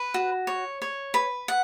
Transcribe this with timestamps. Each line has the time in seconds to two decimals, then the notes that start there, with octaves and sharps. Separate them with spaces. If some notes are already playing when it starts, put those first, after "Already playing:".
Already playing: B4
0.14 F#4
0.47 C#5
0.82 C#5
1.14 B4
1.48 F#5